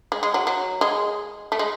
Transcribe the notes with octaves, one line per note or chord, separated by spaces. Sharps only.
G#3
G#3
F#3
F#3
G#3
A3
G#3